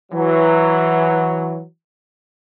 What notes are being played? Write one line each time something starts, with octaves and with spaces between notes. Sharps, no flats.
E3 F#3